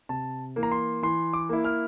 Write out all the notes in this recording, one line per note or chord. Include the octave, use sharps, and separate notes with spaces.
C3 A5
E3 A#3
A#5
C6
E3 C6
D6
A#3 E4
F6